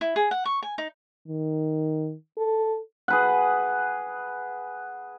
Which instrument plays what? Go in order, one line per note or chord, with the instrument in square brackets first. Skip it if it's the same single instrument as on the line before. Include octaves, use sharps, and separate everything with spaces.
[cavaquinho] E4
G#4
F#5
C#6
G#5
D#4
[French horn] D#3
A4
[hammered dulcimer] G#4 B4 F#5